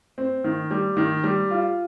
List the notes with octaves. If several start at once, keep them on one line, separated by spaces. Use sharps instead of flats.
C4
D#3
G3
D#3
G3
F4